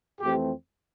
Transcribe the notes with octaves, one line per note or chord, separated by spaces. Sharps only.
F2 E3 A3 C4 G4